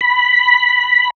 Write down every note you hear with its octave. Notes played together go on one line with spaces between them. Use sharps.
B5